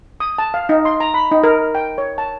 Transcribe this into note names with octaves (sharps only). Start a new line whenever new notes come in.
D#6
A5
F5
D#4
C6
A#5
B5
D#4
A#4
G5
C#5
A5